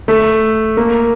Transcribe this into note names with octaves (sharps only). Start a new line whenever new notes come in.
A3
A#3